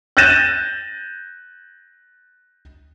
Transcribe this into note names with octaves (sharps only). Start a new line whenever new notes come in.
F#6 G6 A6 A#6 D#7 E7